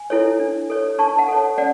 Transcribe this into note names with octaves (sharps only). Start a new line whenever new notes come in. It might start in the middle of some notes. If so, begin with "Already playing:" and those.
Already playing: G#5
E4 A4 C#5
D4
A4 C#5
D4 A5 C#6
F#5 A5
A4 C#5
C#4 D5 F#5